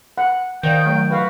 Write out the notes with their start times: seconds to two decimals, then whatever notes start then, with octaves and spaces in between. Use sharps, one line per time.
0.18 F#5
0.63 D#3 C5 D5 F5 G5
0.85 F#3 A3
1.11 F#4 B4 F5